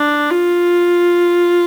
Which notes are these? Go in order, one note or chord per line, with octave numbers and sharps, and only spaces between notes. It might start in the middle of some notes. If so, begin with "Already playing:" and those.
Already playing: D4
F4